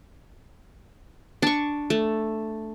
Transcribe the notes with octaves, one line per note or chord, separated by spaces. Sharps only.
D4 C#6
A3